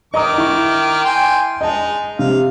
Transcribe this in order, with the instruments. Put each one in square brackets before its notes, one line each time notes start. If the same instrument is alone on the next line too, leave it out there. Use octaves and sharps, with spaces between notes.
[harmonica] D#3 D6 [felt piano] D#5 A#5 D#6
[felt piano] E4 C#6
[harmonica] G5 G#5 C6
[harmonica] G#3 D#4 [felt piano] D#5 A5
[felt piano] C3 [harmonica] F5